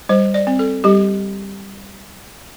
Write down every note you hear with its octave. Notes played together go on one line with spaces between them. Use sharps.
G3 C5
D5
C4
A4
G3 G4